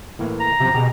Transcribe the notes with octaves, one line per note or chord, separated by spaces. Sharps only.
A2 E3 A#3
A#5
F#2 C3 F3
B2 G4 G#4